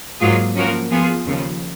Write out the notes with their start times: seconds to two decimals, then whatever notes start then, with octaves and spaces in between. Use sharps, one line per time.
0.20 G#2 F#3 A#3 F4 G#4
0.55 F3 A#3 C#4 F#4 A#4
0.90 F3 B3 F4 G#4
1.25 D#2 C#3 F3